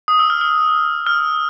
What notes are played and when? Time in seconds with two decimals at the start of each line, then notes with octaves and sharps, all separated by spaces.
0.08 D#6
0.19 E6
0.30 F6
0.41 F6
1.06 F6